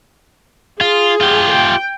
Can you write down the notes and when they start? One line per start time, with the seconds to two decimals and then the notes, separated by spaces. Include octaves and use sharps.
0.81 F4 G#4
1.21 F4 G4
1.52 G5